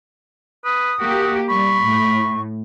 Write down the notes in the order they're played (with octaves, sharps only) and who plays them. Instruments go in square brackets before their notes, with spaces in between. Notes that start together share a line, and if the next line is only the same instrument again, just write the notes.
[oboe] B4 [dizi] D#6
[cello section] A#3 G4 [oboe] F#4
[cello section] G3 [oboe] B5 [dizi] C#6
[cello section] A2